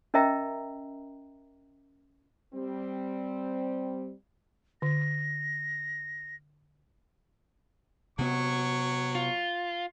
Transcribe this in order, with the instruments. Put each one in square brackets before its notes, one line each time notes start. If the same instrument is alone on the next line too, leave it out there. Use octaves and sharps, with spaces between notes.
[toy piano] C#4 A#4 D#5 E5 G5 A#5
[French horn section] G3 C4
[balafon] D3 [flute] A#6
[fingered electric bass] C3 B3 [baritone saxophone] F#3 [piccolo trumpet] C#6
[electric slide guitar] F4